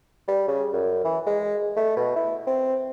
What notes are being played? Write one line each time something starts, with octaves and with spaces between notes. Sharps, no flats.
G3
C#3
F#2
E3
G#3
A3
B2
E4
C4